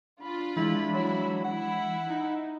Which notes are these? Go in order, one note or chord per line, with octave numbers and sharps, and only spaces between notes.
D4 F4 B5
E3 G#3 E4
F#3 E4
E4 F#5
D#4